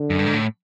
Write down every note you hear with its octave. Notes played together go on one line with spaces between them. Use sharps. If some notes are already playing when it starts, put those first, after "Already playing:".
Already playing: D3
F#2
G2
G#2
A2